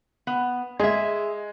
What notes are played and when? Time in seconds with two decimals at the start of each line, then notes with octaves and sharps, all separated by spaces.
0.27 B3
0.80 G#3 G#4 E5